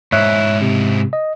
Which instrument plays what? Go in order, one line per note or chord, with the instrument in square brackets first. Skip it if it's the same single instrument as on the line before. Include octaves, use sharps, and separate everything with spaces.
[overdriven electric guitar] G#2 E4 [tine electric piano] C#5 E5 F#6
[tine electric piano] C3
D#5